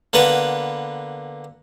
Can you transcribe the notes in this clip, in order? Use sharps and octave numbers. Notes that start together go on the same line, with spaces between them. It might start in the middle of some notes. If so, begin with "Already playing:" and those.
D3 A#3 B3 B4